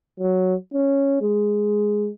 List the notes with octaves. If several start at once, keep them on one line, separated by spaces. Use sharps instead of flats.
F#3
C#4
G#3